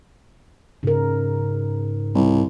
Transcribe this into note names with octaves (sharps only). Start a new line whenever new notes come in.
G#2 C#3 A#4
C2